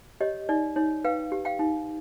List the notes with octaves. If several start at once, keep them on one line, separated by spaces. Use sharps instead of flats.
G4 C#5 D#5
D#4 D5
D#4 C#5
B4 F5 G5
G4
F5 G5
D#4